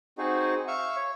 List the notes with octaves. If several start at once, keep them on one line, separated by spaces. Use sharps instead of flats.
C4 D#4 F#4 G#4
E5 F5 C#6
C#5